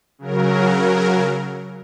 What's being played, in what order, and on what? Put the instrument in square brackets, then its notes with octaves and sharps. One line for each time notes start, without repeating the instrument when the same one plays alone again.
[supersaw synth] C#3 F#3 A#4